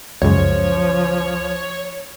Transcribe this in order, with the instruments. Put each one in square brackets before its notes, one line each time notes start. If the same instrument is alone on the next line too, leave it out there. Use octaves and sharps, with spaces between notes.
[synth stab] C#2 F#2 [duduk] F3 [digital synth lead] C#5